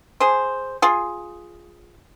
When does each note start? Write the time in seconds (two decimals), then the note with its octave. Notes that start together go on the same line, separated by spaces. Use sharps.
0.20 G#4 C5
0.82 F4 G#4